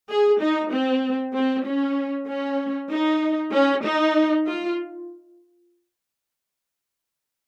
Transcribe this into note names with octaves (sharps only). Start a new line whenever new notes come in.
G#4
D#4
C4
C4
C#4
C#4
D#4
C#4
D#4
F4